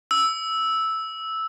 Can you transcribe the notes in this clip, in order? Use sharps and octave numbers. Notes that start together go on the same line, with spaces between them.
E6